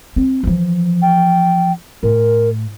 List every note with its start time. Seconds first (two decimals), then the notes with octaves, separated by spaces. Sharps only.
0.16 C4
0.43 E3 F3
1.02 G5
2.03 A2 A#4